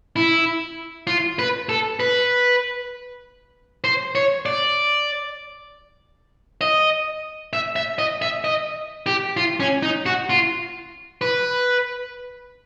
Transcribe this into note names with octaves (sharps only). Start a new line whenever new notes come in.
E4
F4
B4
A4
B4
C5
C#5
D5
D#5
E5
E5
D#5
E5
D#5
G4
F4
C#4
D#4
F#4
F4
B4